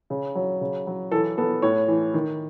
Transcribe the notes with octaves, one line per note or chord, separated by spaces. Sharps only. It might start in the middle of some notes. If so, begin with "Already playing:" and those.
C#3
F#3
C#3
F#3
E3 A4
B3 A4
A2 C#5
E3
D#3